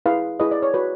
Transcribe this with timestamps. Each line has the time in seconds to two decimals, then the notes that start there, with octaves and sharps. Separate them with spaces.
0.06 E4 G#4 B4 F5
0.40 E4 G#4 B4 D#5
0.51 D5
0.62 C#5
0.74 F#4 B4